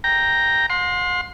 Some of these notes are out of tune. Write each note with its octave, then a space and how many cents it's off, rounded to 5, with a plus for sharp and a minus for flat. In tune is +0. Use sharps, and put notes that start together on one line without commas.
G5 +0 A#5 +0
F#5 -45 C6 +10